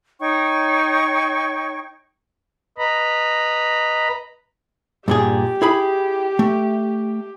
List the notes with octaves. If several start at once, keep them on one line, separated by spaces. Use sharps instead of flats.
D#4 C#5 G5 C#6
B4 D#5 A#5 B5
G2 A#2 G4 G#4
E4 G#4 B5
A3